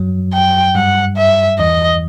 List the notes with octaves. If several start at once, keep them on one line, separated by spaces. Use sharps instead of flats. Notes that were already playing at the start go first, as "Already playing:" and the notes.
Already playing: F#2 F#3
G5
G2 G3 F#5
E5
E2 E3 D#5